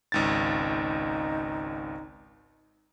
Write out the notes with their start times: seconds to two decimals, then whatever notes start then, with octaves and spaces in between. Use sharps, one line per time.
0.12 G#1 C#2 D#4 A6